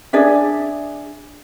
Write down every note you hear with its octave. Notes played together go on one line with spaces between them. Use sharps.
D4 G#4 D5 E5